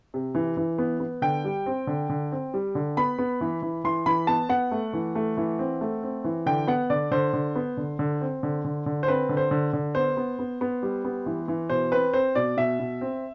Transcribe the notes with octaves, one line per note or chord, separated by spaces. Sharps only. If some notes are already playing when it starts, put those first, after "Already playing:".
C3
E3
E3
B3
B3
D3 G5
G3
C4
D3
D3
C4
G3
D3
B3 B5
B3
E3
E3
E3 C6
E3 B5
B3 A5
B3 F#5
A3
E3
A3
E3
C4
A3
C4
E3
D3 G5
B3 F#5
D3 D5
D3 C5
D3
B3
D3
D3
C4
D3
D3
D3
C5
C4 B4
D3
C5
D3
D3
B3 C5
B3
B3
B3
G3
B3
E3
E3
B2 C5
C4 B4
C4 C5
B2 D5
B2 E5
B2
C4